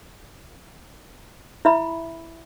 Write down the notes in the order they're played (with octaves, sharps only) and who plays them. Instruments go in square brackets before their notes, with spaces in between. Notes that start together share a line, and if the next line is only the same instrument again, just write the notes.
[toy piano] E4 E5 B5